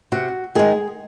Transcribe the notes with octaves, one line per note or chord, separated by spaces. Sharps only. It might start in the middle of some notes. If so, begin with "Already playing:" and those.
C3 F#4
D#3 G#3 G#4